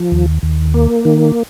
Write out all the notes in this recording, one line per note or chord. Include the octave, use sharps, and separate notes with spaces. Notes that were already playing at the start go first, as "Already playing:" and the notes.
Already playing: F3
D#2
D#2
A#3
D#3